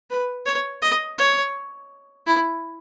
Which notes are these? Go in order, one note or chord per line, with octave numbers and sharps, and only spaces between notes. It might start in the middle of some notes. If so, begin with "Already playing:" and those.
B4
C#5
D#5
C#5
E4